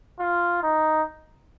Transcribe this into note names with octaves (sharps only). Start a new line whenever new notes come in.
F4
D#4